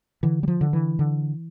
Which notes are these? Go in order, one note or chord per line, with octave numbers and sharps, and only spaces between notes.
D3 E3
G3
F3
D3
E3
D3